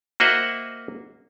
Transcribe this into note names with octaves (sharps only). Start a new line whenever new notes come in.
A#3 F#4 C5 D#5 E5 F#5